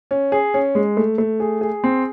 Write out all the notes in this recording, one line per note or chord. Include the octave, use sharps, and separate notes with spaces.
C#4
G#4
C#4
G#3
A3
A3
G#4
G#4
C4